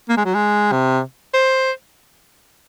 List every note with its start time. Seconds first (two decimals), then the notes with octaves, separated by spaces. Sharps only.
0.09 A#3
0.17 G#3
0.25 F#3
0.34 G#3
0.72 C3
1.34 C5